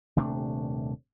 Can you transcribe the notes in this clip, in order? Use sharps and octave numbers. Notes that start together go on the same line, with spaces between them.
D#1 C3 A3 D4